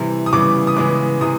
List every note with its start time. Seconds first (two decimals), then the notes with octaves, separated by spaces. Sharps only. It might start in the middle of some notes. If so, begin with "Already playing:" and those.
Already playing: C3 E3 G3
0.26 D#6
0.33 C#3 E3 G3 B3 D6
0.67 D#6
0.76 C#3 E3 G#3 B3 D6
1.21 C3 E3 G#3 D#6